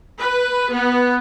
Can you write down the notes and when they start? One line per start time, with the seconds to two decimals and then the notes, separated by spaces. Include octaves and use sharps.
0.18 B4
0.72 B3